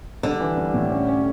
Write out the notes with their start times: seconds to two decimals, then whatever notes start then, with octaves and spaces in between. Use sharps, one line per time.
0.23 D3 G3
0.40 E3
0.58 G3
0.74 A2
0.92 C#4
1.09 C#4